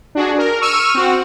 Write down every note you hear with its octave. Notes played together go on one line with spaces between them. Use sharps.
D4 F#4 G#4
A#4
C#6 E6 F6 D#7
C4 F#4